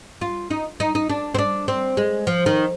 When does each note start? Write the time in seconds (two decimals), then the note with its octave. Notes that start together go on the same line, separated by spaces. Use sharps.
0.21 F4
0.51 D#4
0.80 D#4
0.95 D#4
1.10 D4
1.35 C4
1.38 D4
1.68 C4
1.97 G#3
2.27 F3
2.46 D#3